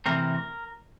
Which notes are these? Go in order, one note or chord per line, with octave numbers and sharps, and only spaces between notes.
C3 E3 A3 C4 A#4